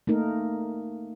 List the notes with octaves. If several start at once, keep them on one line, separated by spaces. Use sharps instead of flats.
A3 A#3 D#4 A#4